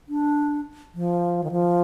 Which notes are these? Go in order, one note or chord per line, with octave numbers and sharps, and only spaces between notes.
D4
F3
D#3
F3